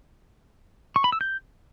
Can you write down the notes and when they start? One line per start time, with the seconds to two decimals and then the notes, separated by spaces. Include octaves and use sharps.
0.96 C#6
1.04 B5
1.12 E6
1.21 G6